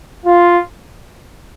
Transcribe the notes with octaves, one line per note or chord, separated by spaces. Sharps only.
F4